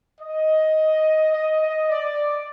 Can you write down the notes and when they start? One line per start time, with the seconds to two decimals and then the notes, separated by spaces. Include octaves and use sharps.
0.20 D#5
1.32 D#5
1.61 D#5
1.89 D5